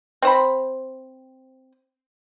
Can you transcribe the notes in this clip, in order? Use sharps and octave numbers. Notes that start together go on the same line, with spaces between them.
C4 C5 B5